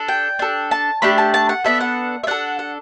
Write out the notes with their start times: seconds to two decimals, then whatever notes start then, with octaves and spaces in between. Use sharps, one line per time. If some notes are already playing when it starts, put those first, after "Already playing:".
Already playing: D4 A4
0.08 G5
0.39 D4 A4
0.71 A5
1.02 A3 D4 G4 B5
1.18 A5
1.34 A5
1.49 F#5
1.64 B3 D4 A4 E5
1.80 F#5
2.23 E5
2.27 D4 A4 F#5
2.59 F#5